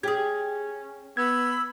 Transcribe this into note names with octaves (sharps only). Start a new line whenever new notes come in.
C#4 G4 G#4 G#6
B3 B5 E6 G#6